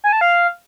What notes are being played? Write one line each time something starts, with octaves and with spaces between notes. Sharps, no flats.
G#5
A5
F5